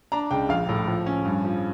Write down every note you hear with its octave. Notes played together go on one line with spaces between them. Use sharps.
D4 A#5
C#2 G5
A#1 F5
A2
F3
C#4
G2
F3